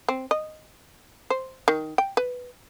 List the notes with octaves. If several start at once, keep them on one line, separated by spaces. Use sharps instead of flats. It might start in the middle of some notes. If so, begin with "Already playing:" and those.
C4
D#5
C5
D#3
G5
B4